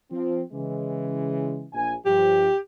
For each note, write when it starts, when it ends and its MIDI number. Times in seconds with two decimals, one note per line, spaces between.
0.11 0.42 53
0.11 0.42 60
0.52 1.66 49
0.52 1.66 52
0.52 1.66 56
1.73 1.95 34
1.73 1.95 80
2.05 2.48 43
2.05 2.48 53
2.05 2.58 67